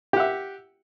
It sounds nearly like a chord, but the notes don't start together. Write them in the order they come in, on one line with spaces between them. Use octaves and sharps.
G4 F#5 E5